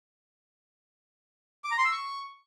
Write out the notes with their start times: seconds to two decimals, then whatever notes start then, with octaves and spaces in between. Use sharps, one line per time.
1.64 D6
1.71 A#5
1.78 C6
1.85 E6
1.92 C#6